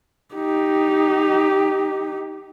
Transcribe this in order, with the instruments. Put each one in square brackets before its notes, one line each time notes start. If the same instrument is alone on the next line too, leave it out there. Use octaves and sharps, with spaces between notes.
[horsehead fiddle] D#4 G4